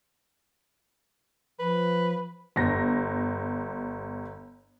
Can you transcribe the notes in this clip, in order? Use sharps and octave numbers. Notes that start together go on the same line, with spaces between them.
F3 B4
G1 A#6